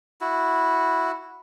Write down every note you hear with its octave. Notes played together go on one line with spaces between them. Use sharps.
E4 F#4